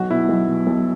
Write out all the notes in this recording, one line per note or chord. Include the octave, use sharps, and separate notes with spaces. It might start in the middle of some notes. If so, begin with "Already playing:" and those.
Already playing: B1 F#4
B2 E4
B1
B2
B1